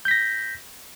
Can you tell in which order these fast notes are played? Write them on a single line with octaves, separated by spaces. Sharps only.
G6 B6 A#6